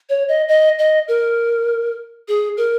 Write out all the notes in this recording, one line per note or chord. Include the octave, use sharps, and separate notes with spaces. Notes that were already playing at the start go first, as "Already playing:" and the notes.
C#5
D#5
D#5
D#5
A#4
G#4
A#4